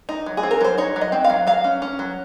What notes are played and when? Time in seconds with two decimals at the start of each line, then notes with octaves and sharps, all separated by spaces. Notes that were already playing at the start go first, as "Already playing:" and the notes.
0.09 D#4
0.26 F#3
0.37 G#4
0.43 C4
0.51 A#4
0.61 F#3 C5
0.78 D#4 C#5
0.96 F#3
1.01 D#5
1.12 C4
1.24 F5
1.30 F#3
1.47 F#3 F5
1.64 C#4
1.82 C#4
1.99 F#3